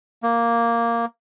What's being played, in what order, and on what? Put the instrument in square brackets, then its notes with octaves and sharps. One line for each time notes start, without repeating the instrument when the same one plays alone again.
[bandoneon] A#3